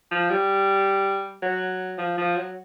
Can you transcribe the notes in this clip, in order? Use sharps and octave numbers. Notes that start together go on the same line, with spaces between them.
F3
G3
F#3
F3
F3
F#3